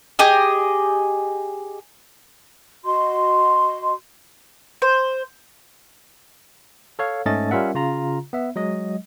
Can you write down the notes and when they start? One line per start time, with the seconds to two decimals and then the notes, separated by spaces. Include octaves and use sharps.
0.19 G4 G#4 D#5
2.85 F#4 D#5 C6
4.82 C5
6.99 A4 C#5 F5
7.26 G#2 A3 C#4 D#5 A5 A6
7.51 G3 C#4 F4 A#4 E5 F#5
7.75 C#3 F4 A#5
8.33 B3 E5
8.56 F#3 G#3 D#5